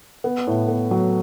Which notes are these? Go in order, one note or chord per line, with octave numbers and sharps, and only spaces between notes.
B3
A2
B3
F#3